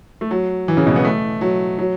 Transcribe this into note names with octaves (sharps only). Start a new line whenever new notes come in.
A3
F#3
E3
C#3
B2
B3
A3
F#3
F#3